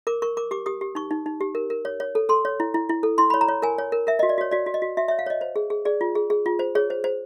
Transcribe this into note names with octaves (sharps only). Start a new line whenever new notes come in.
A#4 D6
A#4 C#6
A#4 D6
G4 D6
G4 D#6
G4
D#4 C#6
D#4
D#4
G4
A#4
A#4
C#5
C#5
A4
A4 C6
C#5
E4
E4
E4
A4
E4 C6
C#5 B5
A#5
C#5
A#4 G#5
C#5
A#4
A#4 E5
F#4 D#5
D5
F#4 C#5
F#4 D5
F#4
D#5
F#4
F#4 E5
C#5 E5
F5
C#5 D#5
C5
G#4
G#4
G#4 D5
F4
G#4
G#4
F4
C5
G#4 C#5
C5
C5